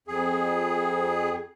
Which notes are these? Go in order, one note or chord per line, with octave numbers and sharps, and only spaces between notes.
F2 G#4